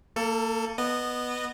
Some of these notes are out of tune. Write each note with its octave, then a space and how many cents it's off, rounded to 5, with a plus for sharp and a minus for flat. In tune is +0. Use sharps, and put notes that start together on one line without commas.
A#3 -30 A4 +15
B3 +0 D#5 -25